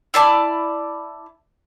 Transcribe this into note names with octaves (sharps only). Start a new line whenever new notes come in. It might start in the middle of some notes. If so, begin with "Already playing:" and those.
E4 D5 A5 D6